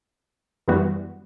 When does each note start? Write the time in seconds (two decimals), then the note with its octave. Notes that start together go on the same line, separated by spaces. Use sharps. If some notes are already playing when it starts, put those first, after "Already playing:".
0.68 F#2 E3 G3 B3 F#4